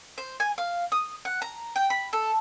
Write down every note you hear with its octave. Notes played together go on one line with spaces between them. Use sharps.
C5
G#5
F5
D#6
F#5
A#5
G5
B5
A4